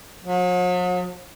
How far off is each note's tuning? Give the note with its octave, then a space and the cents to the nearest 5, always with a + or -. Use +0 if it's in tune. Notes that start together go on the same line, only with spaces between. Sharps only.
F#3 -45